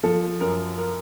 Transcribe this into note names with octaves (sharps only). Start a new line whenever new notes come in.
F3 A4
F#2 A#4
A#4